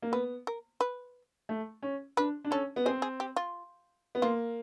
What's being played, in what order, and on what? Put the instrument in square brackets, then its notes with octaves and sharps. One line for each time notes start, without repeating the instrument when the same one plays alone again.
[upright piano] A#3
[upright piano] B3 [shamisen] B4
[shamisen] A#4
B4
[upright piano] A3
C#4
[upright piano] D4 [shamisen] B4
[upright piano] D4
[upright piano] C#4 [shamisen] A4
[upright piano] B3
[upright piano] C4 [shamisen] G#4
[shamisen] G#4
G4
F4
[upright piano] B3
[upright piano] A#3 [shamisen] F4